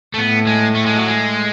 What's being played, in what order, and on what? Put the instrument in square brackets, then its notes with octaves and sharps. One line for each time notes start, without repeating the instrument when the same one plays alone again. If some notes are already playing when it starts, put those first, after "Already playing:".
[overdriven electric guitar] A3
[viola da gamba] A2 [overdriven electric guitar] B3
[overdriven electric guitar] G#3
A3
G#3
F#3
G#3